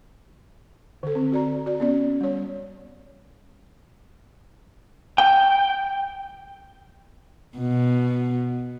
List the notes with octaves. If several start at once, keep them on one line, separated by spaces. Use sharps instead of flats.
D3 A4
C4
F#4 D5 A#5
F#4 D5
B3 C#4 D5
G3 C#5
G5
B2